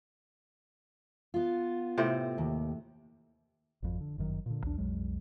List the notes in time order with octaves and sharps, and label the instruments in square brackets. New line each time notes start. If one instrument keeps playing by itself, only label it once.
[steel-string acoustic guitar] B3 F4
[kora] A2 C3 C4
[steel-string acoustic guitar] D#2
[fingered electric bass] G#1 F2
D3
G1 F#2 D#3 F#3
A#2 D3
B1 E2 D4
B1 F2 F#3 G#3